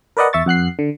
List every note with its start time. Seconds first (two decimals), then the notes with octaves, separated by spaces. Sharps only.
0.17 A#4 B4 D5 D#5 F#5
0.33 E2 E5 C#6 A6
0.46 F2 F#5 F#6 C7
0.79 D3